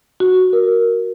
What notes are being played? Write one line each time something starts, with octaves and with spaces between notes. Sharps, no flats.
F#4
A#4